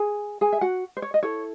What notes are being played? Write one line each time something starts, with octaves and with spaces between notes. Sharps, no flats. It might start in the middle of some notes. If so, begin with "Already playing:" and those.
Already playing: G#4 G#5
G#4 G#5
E5
F#4 F#5
C5
C#5
D#5
E4 A4 C#5